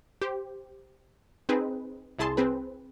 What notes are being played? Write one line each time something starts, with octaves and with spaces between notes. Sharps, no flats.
G4 C5
C4 D#4 G#4 B4
C2 E4 G#4 A5 C6
C4 G#4 B4